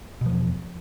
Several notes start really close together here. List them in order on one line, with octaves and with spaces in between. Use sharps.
B2 F3 E2